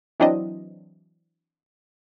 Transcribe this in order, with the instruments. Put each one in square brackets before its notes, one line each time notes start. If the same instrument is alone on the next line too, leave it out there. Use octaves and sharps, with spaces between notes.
[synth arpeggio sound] E3 F#3 C4 D4 E4 D#5